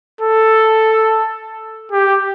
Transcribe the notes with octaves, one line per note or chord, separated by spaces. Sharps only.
A4
G4